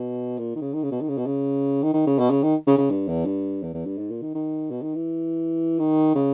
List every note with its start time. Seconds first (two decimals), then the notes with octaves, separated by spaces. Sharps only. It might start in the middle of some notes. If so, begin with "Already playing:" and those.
Already playing: B2
0.38 A#2
0.55 D#3
0.62 C#3
0.73 D#3
0.83 C#3
0.92 B2
1.01 D#3
1.09 C#3
1.18 B2
1.26 C#3
1.83 D#3
1.94 D#3
2.07 C#3
2.19 B2
2.30 C#3
2.43 D#3
2.67 C#3
2.78 C#3
2.90 G2
3.08 E2
3.26 G2
3.63 E2
3.74 E2
3.86 G2
3.98 G#2
4.10 A#2
4.22 D#3
4.35 D#3
4.71 B2
4.82 D#3
4.95 E3
5.79 D#3
6.15 C#3